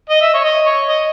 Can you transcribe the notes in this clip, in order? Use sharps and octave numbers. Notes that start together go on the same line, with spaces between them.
D#5
E5
C#5
D#5
C#5
D#5